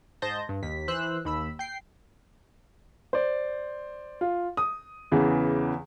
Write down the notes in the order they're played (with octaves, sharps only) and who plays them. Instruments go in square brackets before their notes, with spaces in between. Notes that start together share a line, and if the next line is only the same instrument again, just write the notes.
[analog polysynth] G#2 C5 D#5 A5 G6 A#6
G2
D#2 B6
E3 C5 E6 F#6
D#2 B5 E6
G5 C7
[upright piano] C5 D5
F4
D#6
E2 C#3 E3